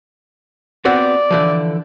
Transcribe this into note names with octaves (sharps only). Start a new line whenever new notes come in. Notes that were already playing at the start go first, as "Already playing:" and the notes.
B3 C4 F#4 D5
D3 E3 F3